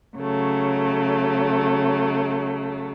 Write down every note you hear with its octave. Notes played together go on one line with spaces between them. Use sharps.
C#3 F#3 A3